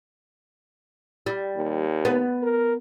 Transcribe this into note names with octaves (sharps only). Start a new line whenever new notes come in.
G3
D#2
B3
A#4